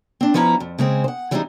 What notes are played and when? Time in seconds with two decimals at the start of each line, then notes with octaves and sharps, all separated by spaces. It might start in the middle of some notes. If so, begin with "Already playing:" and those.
0.21 C4 D4
0.34 F3 B3 C#4 E4 F5 A#5
0.60 F2
0.78 C#3 G#3 C4 G#4
1.04 C5 F#5
1.31 E3 G3 G#3 C4 C#4 D#4